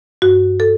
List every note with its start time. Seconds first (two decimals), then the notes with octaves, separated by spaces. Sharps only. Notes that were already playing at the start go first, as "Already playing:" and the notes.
0.22 G2 F#4
0.60 A4